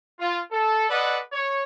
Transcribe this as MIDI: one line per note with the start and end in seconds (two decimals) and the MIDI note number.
0.19 0.40 65
0.52 0.88 69
0.89 1.19 69
0.89 1.19 71
0.89 1.19 74
0.89 1.19 75
0.89 1.19 78
1.33 1.63 73